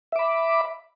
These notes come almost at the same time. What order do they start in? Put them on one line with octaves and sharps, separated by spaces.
E5 D6 B5